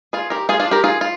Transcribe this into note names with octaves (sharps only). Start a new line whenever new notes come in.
F4 G#4
G4 A#4
F4 G#4
D4 F4
G4 A#4
F4 G#4
F4